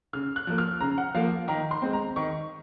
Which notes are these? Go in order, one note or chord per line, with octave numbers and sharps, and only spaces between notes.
C#3 F6
F#6
F3 A#3
F6
C#3 A#5
F#5
F3 A#3 F5
D#3 A#5
C6
G#3 C4
A#5
D#3 C#6